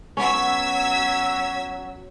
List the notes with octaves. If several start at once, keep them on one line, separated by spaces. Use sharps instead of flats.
F#3 B3 C#4 E6 G#6 B6